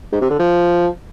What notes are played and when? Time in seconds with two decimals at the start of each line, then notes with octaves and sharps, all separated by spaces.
0.12 G#2
0.21 C3
0.30 D3
0.39 F3